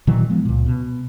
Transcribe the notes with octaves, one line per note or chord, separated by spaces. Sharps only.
A#2 D#3 E3 F#3
F3 G#3 B3
C#2 A#2
B2